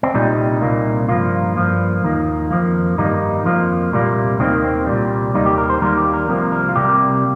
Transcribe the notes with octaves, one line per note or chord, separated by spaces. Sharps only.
C4
C2 A#2 G3 D#4
C2 A#2 A#3
G2 F3 A#3 F4
G2 F3 A#3
D#2 D#3 A#3
F2 F3 A#3
G2 D#3 G3 A#3 D#4
F2 F3 A#3 F4
C2 A#2 G3 A#3
D#2 D#3 G3 A#3 C4
C4
C2 A#2 G3
D#2 D#3 G3 A#3 D#4
G4
A#4
C5
D#2 D#3 G3 A#3 A#4
G4
A#4
C2 C3 F3 A#3
A#4
F4
C2 C3 G3 A#3 G4